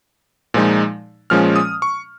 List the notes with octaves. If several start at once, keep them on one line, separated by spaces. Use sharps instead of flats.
A#2 F3 G#3 D#4
A#2 F3 G#3 C#4 F6
D#6
C#6